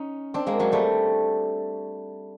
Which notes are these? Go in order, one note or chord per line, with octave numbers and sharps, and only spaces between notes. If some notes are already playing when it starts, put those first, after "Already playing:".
Already playing: C#4 D#4
C4 D4
G#3 A#3
F#3 G#3
G3 A3